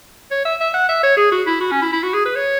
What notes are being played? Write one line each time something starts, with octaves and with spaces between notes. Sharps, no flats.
C#5
E5
E5
F#5
E5
C#5
G#4
F#4
E4
F#4
C#4
E4
E4
F#4
G#4
B4
C#5